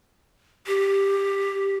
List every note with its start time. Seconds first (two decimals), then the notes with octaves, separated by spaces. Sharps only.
0.67 G4